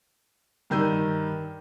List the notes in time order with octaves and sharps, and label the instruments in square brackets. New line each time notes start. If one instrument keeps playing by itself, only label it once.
[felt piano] G2 D#3 E6 G6 D#7